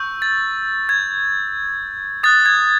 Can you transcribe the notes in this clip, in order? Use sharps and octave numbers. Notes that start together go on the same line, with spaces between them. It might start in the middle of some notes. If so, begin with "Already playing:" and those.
Already playing: C#6 E6 G6
A6
G#6
D#6 F#6 A6
G#6